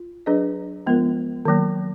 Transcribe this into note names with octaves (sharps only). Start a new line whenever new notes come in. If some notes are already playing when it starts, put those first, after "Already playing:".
Already playing: F4
F#3 D4 G#4 B4 D#5
F3 G#3 B3 F4 A#4
D#3 F#3 A#3